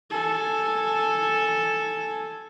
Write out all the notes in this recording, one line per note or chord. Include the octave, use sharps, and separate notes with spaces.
A4 G#5